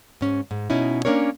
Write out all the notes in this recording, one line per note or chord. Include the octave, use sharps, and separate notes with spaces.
G#2 C#4
G#2
B2 C#4 D#4 E4
A#3 C#4 D4 A#4 C#5